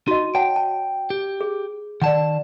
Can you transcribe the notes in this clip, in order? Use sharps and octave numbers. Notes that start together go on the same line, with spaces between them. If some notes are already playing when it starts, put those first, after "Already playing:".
D#4 F#4 D#5
C#5 F#5 G5 A5
A5
G4
G#4
D#3 D5 F#5 A5